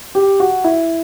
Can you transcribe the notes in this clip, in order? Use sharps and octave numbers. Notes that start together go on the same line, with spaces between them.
G4
F#4
E4